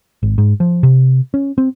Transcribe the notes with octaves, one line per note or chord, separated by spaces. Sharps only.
G#1
G#2
F3
C3
C#4
C4